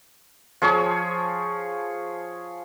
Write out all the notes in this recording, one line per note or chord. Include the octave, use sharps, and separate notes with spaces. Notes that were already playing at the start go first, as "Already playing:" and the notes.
F3 G#4 C#5